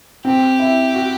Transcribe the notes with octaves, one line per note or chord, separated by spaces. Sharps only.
C4 G4
E4
F#4